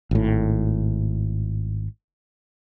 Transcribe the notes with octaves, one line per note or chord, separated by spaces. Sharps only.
G#1 A2